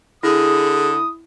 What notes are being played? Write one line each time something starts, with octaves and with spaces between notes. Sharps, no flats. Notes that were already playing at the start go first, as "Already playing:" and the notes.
D3 E4 G#4 D#6